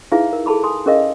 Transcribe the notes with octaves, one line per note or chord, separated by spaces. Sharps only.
D#4 E4 G#4 B4 E5 F5
A#4
G#4 A4 A5 B5 D6
G#5 C6 D#6
C#4 G#4 A#4 D#5 F5